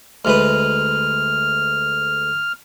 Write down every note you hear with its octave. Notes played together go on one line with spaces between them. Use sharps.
D2 G#3 B4 F6